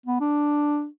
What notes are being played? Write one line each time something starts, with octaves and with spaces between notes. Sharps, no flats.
B3
D4